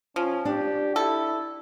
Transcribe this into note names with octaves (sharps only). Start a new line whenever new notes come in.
F3 C#4
D4 G4
E4 A4